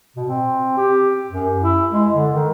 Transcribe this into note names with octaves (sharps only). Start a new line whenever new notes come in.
B2
C4
G4
F#2
E4
G#3
D3
D#3